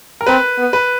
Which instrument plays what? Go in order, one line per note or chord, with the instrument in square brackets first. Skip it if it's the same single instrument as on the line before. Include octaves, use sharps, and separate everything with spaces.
[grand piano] A#4
[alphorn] C4 [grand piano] B4
[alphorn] B3
[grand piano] B4